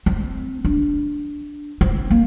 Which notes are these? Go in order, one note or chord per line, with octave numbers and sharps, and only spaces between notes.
C4
D4
C4
A#3